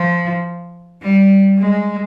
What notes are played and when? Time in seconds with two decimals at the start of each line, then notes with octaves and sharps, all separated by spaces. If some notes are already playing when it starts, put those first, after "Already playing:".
Already playing: F3
1.03 G3
1.58 G#3